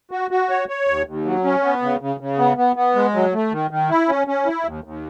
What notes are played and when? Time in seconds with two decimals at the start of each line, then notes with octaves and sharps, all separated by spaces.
0.11 F#4
0.31 F#4
0.50 C#5
0.68 C#5
0.87 D#2
1.06 D#2
1.25 F#3
1.44 C#4
1.63 B3
1.82 C#3
2.01 C#3
2.20 C#3
2.38 B3
2.57 B3
2.76 B3
2.95 G#3
3.14 F#3
3.33 A3
3.52 D#3
3.71 D#3
3.90 E4
4.09 C#4
4.27 C#4
4.46 E4
4.65 D#2
4.84 D#2